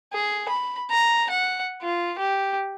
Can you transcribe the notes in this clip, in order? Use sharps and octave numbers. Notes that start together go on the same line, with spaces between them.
G#4
B5
A#5
F#5
F4
G4